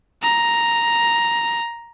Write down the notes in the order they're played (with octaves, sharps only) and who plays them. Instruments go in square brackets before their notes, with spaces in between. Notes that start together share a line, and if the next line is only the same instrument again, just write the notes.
[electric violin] A#5